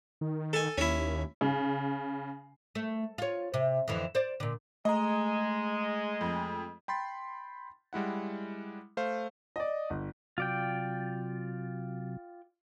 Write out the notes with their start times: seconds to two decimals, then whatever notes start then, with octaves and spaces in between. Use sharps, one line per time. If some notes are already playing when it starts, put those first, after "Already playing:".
0.21 D#3
0.53 A4 G#5
0.78 D#2 C#4 E4
1.41 C#3
2.75 A3
3.18 F4 C#5
3.54 C3
3.88 F2 D3 E3
4.15 C5 D5
4.40 A#2 D3
4.85 G#3 A3 D#5 A#5
6.21 F2
6.88 G5 B5 C6 A6
7.93 G3 G#3 E4 F#5
8.97 A3 C5 F5
9.56 D5 D#5
9.90 G1
10.38 C3 F#3 F4 D5 G5